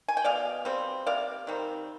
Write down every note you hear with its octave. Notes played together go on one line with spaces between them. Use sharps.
G#5
G5
B2 D5 F5
G3 C4
C3 D5 F5
D#3 G3 C4